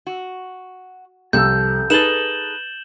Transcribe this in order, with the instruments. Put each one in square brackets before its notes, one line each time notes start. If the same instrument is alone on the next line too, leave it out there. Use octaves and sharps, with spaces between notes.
[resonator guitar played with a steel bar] F#4
[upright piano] C2 [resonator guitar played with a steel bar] F3 A4 [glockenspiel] G6
[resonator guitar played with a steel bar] D#4 G#4 A4 [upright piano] B4 A6 [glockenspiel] E7 F#7 G7